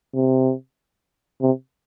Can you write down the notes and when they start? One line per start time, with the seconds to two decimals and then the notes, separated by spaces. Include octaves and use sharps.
0.14 C3
1.41 C3